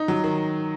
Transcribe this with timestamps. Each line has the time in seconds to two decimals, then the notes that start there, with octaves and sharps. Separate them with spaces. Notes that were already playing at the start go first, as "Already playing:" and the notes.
Already playing: D#4
0.08 F#3
0.24 D#3